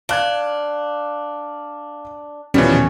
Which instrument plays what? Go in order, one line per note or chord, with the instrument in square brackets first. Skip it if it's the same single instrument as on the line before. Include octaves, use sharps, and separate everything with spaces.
[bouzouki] D4 [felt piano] F5 F#6 G#6
[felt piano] D#1 B2 [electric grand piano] E3 F3 G3 [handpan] C#4 [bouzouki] F#4